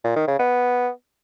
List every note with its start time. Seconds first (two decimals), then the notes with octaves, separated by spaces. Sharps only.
0.04 A#2
0.16 D#3
0.28 C#3
0.39 B3